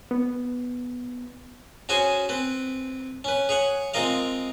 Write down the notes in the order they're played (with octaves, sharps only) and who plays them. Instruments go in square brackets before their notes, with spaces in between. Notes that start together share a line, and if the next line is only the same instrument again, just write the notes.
[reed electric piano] B3
[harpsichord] C#4 F#4 G#4 C5 G#5
C4 B4
C#4 B4
G#4 C#5 F#5
G#3 C4 F4 A#4 D#5 F5